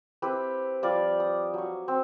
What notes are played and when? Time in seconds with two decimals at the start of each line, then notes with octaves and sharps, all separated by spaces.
0.22 C4 E4 G4 B4
0.83 F3 G3 D5 F5
1.20 D#6
1.54 F#3 C#6
1.88 C4